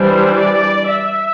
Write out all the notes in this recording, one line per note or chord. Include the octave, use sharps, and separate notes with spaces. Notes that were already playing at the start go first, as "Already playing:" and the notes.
Already playing: E3 G3 D4 C5
D5
E5